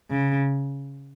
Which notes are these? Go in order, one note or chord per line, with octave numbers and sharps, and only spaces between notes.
C#3